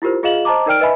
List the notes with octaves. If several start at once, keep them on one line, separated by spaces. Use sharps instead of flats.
E4 F4 G4 A#4 C5
F4 G#4 D#5 F5 E7 F#7
C5 D#5 A5 A#5 D6
D#4 A#4 D5 G5 F6 D7
B4 D#5 E5 G#5 B5